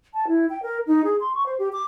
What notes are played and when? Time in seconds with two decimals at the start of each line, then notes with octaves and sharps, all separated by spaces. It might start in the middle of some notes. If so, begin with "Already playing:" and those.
0.14 A5
0.27 E4
0.50 G5
0.63 A#4
0.87 D#4
1.04 G#4
1.20 C6
1.34 C#6
1.46 C5
1.59 G4
1.73 D6